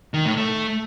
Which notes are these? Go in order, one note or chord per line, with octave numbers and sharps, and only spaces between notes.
D#3
A2
A3